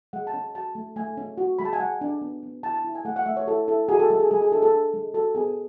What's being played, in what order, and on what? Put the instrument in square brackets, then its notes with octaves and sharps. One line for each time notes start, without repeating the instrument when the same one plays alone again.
[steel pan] G#3 F#5
A5
C#4
F#4 A5
A3
A3 G#5
C#4
F#4
G#3 B5
A5
G#5
G#3 F#5
D4
B3
B3
E4 A5
A5
E4
G#5
A3 F#5
F#5
A3 E5
C#5
E4 A4
E4 A4
F#4 G#4
A4
G#3 A4
G#4
G#3 G#4
G#4
D4 A4
A4
D4
G#3
F#4 A4
B3 G#4